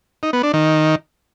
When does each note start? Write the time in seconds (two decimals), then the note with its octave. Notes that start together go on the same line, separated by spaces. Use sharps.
0.23 D#4
0.33 B3
0.43 D4
0.53 D#3